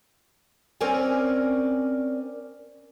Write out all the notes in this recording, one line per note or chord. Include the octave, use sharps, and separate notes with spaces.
C4 C#4 A#4 D5 G#5